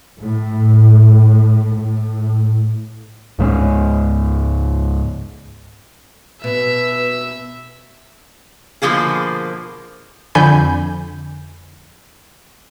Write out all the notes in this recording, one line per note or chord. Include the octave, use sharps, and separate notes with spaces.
A2
A2
C#2 G#2 G#3 C#4
B2 B4 E5
B2 D3 F3 A#3 G#4
F2 D3 G#5 B5 G6